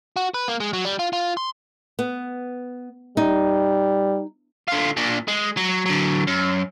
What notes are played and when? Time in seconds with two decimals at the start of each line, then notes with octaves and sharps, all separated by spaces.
0.16 F#4
0.34 B4
0.48 A#3
0.60 G#3
0.73 F#3
0.85 G3
0.99 F4
1.13 F4
1.37 C6
1.99 B3
3.17 G3 D#4
4.68 D3 F4
4.97 A#2 D4
5.28 G#3
5.57 F#3
5.86 D3 F#3
6.27 F#2